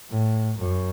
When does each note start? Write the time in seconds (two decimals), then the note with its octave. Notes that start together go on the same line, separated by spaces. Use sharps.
0.10 A2
0.57 F#2